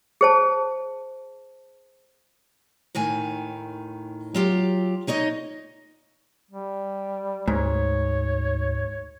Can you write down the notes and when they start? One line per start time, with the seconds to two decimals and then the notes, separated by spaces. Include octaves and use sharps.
0.21 G#4 C5 A5
2.95 D#2 A2 D#3 G#5
4.34 F#3 F4 G4
5.07 A#3 D#4 C#5 D#5
6.51 G3
7.48 D2 G#2 C#5